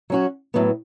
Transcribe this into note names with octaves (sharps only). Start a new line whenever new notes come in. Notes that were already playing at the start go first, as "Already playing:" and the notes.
F#3 C#4 F#4
A2 F#3 B3